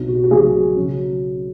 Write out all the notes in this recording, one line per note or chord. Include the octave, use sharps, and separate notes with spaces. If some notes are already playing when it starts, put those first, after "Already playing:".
Already playing: B1 B2 F#3
F#4
F#4
B1 B2 F#3 G#4
C#3 F#3